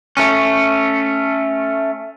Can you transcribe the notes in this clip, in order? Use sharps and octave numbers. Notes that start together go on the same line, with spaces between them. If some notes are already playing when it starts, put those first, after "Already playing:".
A3 C#4